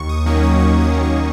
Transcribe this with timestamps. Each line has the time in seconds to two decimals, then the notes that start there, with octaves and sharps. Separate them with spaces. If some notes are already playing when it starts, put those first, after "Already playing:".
Already playing: D#2 C#6
0.09 D#6
0.26 D#3 F#3 A#3 C#4 C#6
0.43 D#6
0.59 D#2 C#6
0.81 D#6
0.92 D#3 F#3 A#3 C#4
1.03 C#6